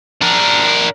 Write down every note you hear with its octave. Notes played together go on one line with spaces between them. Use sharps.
D4 A#4